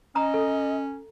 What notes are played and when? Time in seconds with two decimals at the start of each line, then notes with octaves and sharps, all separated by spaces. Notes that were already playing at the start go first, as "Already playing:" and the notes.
0.15 C#4 D#5 A#5 D#6
0.34 A4